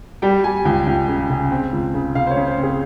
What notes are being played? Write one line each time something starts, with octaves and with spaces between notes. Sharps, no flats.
G3 G5
G3 G#5
C#2 G5
C#2 G5
C#3
C#3
C4
C#2
C#3
C#3 F5
C5
C#5
C#3
C5
C4
G#4